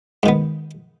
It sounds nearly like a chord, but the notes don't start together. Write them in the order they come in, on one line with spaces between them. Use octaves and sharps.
G#2 D#3 B3